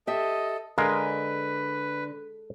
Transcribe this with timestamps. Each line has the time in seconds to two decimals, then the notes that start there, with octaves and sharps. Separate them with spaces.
0.07 G4 A4 D#5 E5
0.78 D3 G#3 A#4 B4 F5